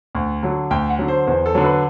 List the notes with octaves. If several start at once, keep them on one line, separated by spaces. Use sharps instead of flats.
D2
D3 F#3
D2 G5
F#5
D3 F#3
C5
E2 C5
A4
D3 F#3
B4